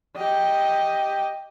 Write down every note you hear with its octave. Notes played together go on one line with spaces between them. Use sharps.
G4 D#5